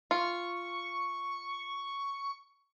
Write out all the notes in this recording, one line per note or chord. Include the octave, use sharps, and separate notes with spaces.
F4 C#6